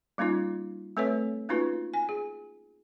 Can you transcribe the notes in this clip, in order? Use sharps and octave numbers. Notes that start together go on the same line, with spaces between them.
G3 A#3 C#4 D#4 F4
A3 C4 A4 B4 C#5 E5
A#3 C#4 D#4 F4 F#4 B4
G#5
G#4